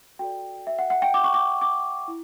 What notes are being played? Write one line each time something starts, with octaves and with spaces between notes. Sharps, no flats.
F#4 A4 D5 G5
E5
F#5
F#5
G5
D6
C#6
D6
D6
E4